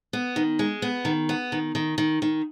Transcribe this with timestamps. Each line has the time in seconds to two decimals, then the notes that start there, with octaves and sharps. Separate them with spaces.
0.13 B3
0.36 D#3
0.59 G#3
0.82 B3
1.05 D#3
1.29 B3
1.52 D#3
1.75 D#3
1.98 D#3
2.22 D#3